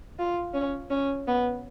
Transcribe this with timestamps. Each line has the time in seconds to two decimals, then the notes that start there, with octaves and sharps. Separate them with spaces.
0.19 F4
0.54 C#4
0.90 C#4
1.27 B3